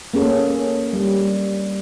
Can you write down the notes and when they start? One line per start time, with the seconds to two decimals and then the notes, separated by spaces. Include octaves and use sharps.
0.14 A#3 C#4 G#4 A4
0.93 G3